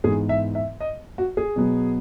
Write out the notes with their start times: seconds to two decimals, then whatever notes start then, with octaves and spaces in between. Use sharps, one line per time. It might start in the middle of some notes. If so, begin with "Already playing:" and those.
0.04 G#2 E3 B3 G#4
0.29 E5
0.55 E5
0.80 D#5
1.18 F#4
1.37 G#4
1.56 B2 F#3 B3